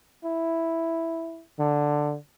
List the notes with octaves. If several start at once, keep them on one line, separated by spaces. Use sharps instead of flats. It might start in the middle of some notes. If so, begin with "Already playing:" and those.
E4
D3